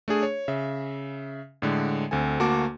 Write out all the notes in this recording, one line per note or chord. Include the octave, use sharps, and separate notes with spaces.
A3 D4 G#4
C#5
C#3 E5
A2 D3 G#3
D2 C4 A4 G#5
D2 A#3 F#4 A5 D6